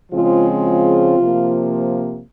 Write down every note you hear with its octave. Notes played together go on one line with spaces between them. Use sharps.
C#3 F3 G#3 C4 F4
F4
C3 F3 A#3